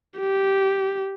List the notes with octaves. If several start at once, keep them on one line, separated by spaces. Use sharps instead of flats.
G4